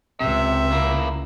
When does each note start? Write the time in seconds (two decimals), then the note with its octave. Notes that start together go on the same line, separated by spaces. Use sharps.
0.20 C#2 C3 E5
0.72 A#3 E4